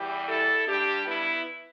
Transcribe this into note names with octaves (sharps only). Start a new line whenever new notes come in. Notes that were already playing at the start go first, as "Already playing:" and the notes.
Already playing: E2 E3 G3 G4
E4 A4
G2 G3 D4 G4
B3 E4